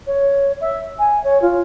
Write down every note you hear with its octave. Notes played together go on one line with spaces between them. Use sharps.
C#5
E5
G#5
C#5
F4